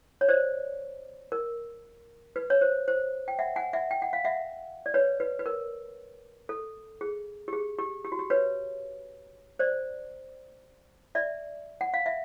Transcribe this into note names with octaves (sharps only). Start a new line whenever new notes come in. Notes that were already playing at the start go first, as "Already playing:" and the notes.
C#5
C5 D5
A#4
B4
C#5
C5
C5
G5
E5 F#5
F#5 G#5
E5 F#5
G5
F#5
F5
E5 F#5
D5
B4 C#5
B4
B4
A#4
A4
G#4
G4
G#4
G4
G4
F#4
G4
B4 C#5
C5 D5
D5 E5
F#5
F5
E5